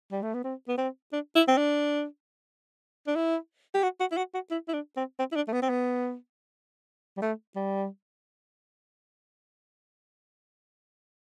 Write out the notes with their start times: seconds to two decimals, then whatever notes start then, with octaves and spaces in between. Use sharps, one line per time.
0.12 G3
0.23 A3
0.34 B3
0.44 C4
0.68 B3
0.78 C4
1.13 D4
1.35 E4
1.48 C4
1.57 D4
3.07 D4
3.16 E4
3.75 G4
3.83 F#4
4.00 F#4
4.12 E4
4.17 F#4
4.34 F#4
4.51 E4
4.68 E4
4.74 D4
4.97 C4
5.19 C4
5.32 E4
5.36 D4
5.48 A3
5.52 B3
5.62 C4
5.70 B3
7.17 G3
7.22 A3
7.56 G3